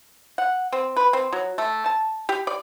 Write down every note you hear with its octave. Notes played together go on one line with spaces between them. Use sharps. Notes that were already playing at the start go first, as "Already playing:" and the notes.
F#5
C4
B4
C4
F#3
A3
A5
G4
D5